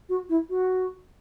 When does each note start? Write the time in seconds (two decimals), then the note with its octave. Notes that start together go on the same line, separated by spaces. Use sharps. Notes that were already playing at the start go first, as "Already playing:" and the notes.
0.09 F#4
0.29 E4
0.50 F#4